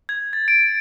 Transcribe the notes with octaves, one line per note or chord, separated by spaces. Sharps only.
G#6
A6
D7